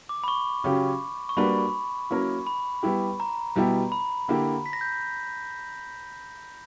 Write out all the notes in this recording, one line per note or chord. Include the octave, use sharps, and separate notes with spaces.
D6
B5
C#6
C#3 F#3 C#4 G4
C#6
G3 A#3 D4 F#4 B4 B5
F#3 A#3 C#4 E4 A#4
B5
G3 B3 E4 G4
A#5
B2 G3 B3 E4 G4
B5
D3 A#3 E4 G4
B6
A#6
G6